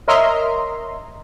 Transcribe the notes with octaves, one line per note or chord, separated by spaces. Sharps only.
A#4 C#5 D#5 E5 A#5 C6